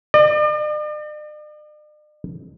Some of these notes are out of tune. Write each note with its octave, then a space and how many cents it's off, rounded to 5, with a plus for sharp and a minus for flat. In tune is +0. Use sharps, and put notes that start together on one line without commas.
D5 +45